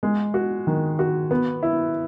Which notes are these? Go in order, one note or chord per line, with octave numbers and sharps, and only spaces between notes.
G#3
F#4
D#3
F#4
B3
E4